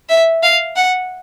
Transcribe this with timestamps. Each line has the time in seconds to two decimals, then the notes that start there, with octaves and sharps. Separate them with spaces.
0.09 E5
0.43 F5
0.76 F#5